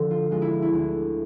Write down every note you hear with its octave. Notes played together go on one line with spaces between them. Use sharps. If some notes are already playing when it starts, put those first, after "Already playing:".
Already playing: D3 F3 A4
F4
G#3 F4
E4
E4
D2